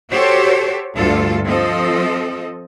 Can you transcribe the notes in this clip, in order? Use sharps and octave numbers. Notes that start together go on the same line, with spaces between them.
F#4 G4 A4 C5 C#5
D2 G2 F4 A4
F3 C4 A4 D#5